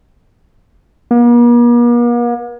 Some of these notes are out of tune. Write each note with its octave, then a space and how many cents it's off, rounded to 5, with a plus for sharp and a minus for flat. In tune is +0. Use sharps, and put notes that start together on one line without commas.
A#3 +45